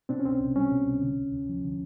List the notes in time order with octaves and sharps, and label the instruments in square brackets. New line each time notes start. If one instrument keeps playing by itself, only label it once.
[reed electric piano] B2 C4 D4
C#4
C2 C4
C2
G3 C#4
B2
C2
D3
D2
D2
F3
D3